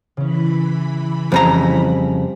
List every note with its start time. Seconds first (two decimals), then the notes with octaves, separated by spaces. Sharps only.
0.17 C#3 E3 C#4 B5
1.32 F2 C#3 G3 C4 G4 A#5